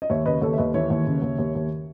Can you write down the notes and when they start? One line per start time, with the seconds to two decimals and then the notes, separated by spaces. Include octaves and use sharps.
0.02 D#5
0.09 D#2 C#5 E5
0.26 C#3 B4 D#5
0.42 D#2 A4 C#5
0.53 E5
0.58 D#2 B4 D#5
0.74 E3 C#5 E5
0.90 D#2
1.07 C#3
1.22 D#2
1.39 D#2
1.55 D#2